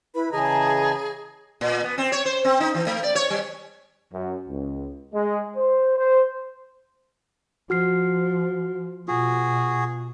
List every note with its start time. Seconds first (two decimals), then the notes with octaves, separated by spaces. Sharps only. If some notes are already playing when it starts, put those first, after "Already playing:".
0.15 E4 B4 B5
0.32 C#3 E3 G#4 D#5 A5 A#5
1.61 A#2
1.83 B3
1.98 C4
2.12 C#5
2.25 C5
2.45 C4
2.60 D#4
2.74 E3
2.87 A3
3.03 D5
3.15 C#5
3.30 G3
4.13 F#2
4.49 C#2
5.14 G#3
5.56 C5
5.98 C5
7.70 F3 F#4 F6 C7
9.08 B2 F4 F#4 G#4